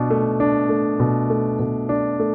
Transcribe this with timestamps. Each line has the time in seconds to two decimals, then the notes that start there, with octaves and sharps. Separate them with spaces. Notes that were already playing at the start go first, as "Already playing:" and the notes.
Already playing: B2 D4
0.10 A3
0.40 D4
0.69 A3
1.00 B2
1.30 A3
1.59 B2
1.89 D4
2.20 A3